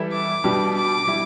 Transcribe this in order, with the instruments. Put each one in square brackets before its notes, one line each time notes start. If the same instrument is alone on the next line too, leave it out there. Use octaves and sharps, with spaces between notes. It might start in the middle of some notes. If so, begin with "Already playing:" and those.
Already playing: [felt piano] E3 G3 E4 A4 E5
[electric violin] D6
[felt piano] B2 G3 B3 D4 G4
[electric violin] D6
[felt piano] G3 E4